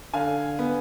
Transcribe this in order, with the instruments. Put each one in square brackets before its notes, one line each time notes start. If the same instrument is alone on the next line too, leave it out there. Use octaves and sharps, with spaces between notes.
[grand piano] D3 F5 G#5
B3